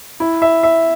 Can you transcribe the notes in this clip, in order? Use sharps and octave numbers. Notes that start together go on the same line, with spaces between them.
E4
E5
E5